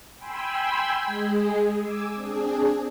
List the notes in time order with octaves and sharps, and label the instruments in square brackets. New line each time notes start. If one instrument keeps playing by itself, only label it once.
[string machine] G5 G#5 B5 C6 E6
G#3 G#4
G#5 D6 E6
C4 D4 G#4